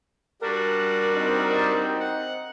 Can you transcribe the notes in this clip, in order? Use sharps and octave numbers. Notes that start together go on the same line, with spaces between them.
G3 D4 F#4 A#4
C4 D#4
F#5